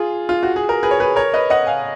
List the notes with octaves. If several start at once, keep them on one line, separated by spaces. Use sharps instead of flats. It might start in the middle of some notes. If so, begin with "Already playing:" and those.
Already playing: F4 G#4
F4
F#4
G#4
A#4
G#4 B4
C#5
G#4 B4
A#4 C#5
B4 D#5
D#5 F#5
F5 G#5